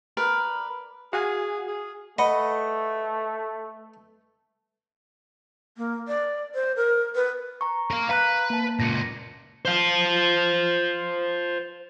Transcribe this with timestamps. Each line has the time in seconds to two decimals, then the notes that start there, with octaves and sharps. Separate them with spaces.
0.17 A#4 B4 D5
1.13 F#4 G#4 F5 G#5
1.68 G#4
2.19 A3 B4 D#5 F#5 B5
5.77 A#3
6.08 D5
6.54 C5
6.76 A#4
7.15 B4
7.61 A#5 C#6
7.91 A#4 F5
8.09 B4 F5 A#5 F#6
8.50 A#3 A5
8.80 C#2 A#2 A#6 C#7
9.65 C5 F5